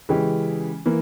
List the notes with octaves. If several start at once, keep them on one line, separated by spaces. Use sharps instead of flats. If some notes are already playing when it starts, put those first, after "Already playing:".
C#3 E3 G#3 C#4 G4
E3 A#3